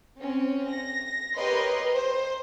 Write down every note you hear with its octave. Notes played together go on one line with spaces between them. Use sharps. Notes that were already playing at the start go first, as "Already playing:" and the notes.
C4 C#4
A#6
G4 A#4 B4 C#5 D#5 C6
C5